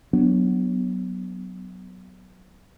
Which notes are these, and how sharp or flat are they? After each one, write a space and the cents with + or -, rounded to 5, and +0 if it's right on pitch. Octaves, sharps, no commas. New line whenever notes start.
F#3 +10 B3 +0 D4 +0